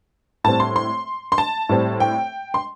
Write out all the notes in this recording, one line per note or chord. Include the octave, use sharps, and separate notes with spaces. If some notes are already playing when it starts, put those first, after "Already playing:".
A2 G3 C4 A5
C6
C6
C6
A5
A2 G3 C4
G5
C6